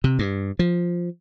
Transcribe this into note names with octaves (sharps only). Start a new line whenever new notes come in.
C3
G2
F3